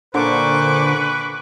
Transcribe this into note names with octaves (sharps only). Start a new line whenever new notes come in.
A#2 D3 B4 C5 C#6 D6